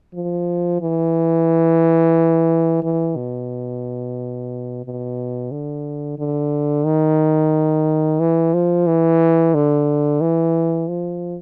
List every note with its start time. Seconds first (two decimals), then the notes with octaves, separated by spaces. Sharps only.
0.14 F3
0.81 E3
2.83 E3
3.16 B2
4.85 B2
5.52 D3
6.19 D3
6.85 D#3
8.20 E3
8.54 F3
8.87 E3
9.55 D3
10.21 E3
10.89 F3